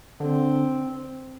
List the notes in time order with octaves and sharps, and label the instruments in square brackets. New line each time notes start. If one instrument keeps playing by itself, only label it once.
[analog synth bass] D3 [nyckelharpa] C4